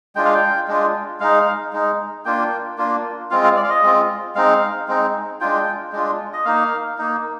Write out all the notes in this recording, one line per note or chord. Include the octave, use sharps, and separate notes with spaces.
G#3 D4 F4 G5
F5
G5
G#3 D4 F4
G#3 D#4 F5
G#3 D#4
A#3 D4 F4 G5
A#3 D4 F4
G#3 C4 F4 F5
F5
D5
F5
D#5
G#3 C4 F4
G#3 C4 D#4 F5
G#3 C4 D#4
G#3 D4 F4 G5
G#3 D4 F4
D#5
A#3 D#4 F5
A#3 D#4